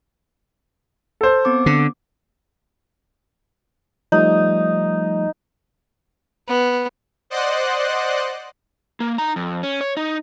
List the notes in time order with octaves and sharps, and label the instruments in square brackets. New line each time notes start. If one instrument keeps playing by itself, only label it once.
[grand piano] A4 C5
[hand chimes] B3 C4 D6
[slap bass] D3
[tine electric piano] F3 G3 A3 [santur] D#4
[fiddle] B3
[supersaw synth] C5 D5 D#5 F#5 C6 F#6
[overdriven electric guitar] A#3
D#4 A#5
F2
C#4
C#5
D#4